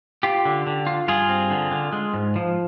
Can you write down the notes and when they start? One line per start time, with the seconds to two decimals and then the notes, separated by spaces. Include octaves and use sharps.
0.23 F4 G4
0.45 D3
0.67 D3
0.87 F4
1.08 G2 F4 G#4
1.29 C4
1.51 D3
1.71 D3
1.93 G#3
2.14 G#2
2.36 F3